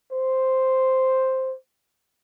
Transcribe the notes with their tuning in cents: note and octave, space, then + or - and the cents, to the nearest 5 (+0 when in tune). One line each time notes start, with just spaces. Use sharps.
C5 +0